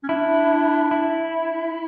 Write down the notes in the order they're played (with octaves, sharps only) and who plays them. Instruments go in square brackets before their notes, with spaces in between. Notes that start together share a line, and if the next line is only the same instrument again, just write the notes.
[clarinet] C#4
[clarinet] D4 [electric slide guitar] E4
[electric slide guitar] E4